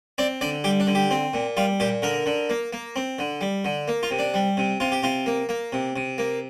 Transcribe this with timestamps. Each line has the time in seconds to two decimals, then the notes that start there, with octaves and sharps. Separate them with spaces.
0.18 C4 D5
0.41 D3 D5
0.64 G3 G4
0.80 D4
0.87 D3
0.95 G4
1.11 C4
1.34 A#2
1.57 G3 F4
1.80 A#2 G4
2.02 D3 A#4
2.26 D3
2.50 A#3
2.73 A#3
2.96 C4
3.19 D3
3.41 G3
3.65 D3
3.88 A#3
4.03 F4
4.11 C3
4.19 D4
4.34 G3
4.57 C3
4.80 C3 F4
4.92 G4
5.03 C3 F4
5.26 A#3
5.49 A#3
5.73 C3
5.96 C3
6.18 A#3